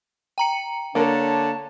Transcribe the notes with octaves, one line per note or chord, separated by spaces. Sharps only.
G5 A#5 C#7
D3 A#3 D4 A#4 C#5 A5